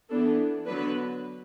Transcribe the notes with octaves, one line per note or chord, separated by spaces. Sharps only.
E3 B3 D4 A4
D3 F#3 B3 D4 B4